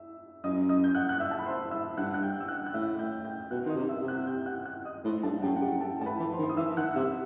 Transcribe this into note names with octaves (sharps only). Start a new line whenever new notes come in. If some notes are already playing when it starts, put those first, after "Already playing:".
Already playing: E5 E6
F#2 D#5 D#6
D#5 D#6
G6
F#5 F#6
F#6
E5 E6
A5
B5
C5 C6
E5 E6
G2 F#5 F#6
F#6
G5 G6
E6
F#5 F#6
F#6
A2 E5 E6
G5 G6
G5 G6
B2 F#5 F#6
D#3 D#5 C6 D#6
C3
E5 E6
C3
F#5 F#6
G5 G6
F#5 F#6
F#5 F#6
D#5 D#6
A2 C5 C6
G2 A4 A5
F#5
F#2 G4 G5
F#5
F#2 G4 G5
A4 A5
A2 A5
B4 B5
E3
C5 C6
D#3
C6
D#6
E3 E5 E6
D#3 F#5 F#6
C3 E5 E6